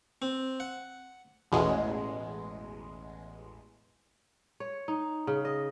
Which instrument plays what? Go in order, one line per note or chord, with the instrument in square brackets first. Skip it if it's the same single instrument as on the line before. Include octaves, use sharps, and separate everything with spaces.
[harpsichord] C4
F#5
[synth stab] A1 E2 B2 G#3
[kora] C#5
D#4
C#3
D#5